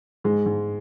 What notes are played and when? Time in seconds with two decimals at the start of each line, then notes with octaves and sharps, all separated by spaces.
0.24 G#2 G#3
0.46 G#2